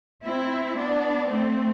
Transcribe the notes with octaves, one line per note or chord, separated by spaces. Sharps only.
C4 E4
B3 D4
A3 C4